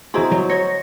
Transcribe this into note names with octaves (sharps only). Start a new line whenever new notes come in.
D3 E4 F#4 G#4 C5 D#5 A#5 C6
F#3
C#5 A#6